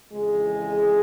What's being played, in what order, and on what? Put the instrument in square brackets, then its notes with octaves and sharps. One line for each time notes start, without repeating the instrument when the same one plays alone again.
[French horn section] F2 C#3 E3 G#3 G#4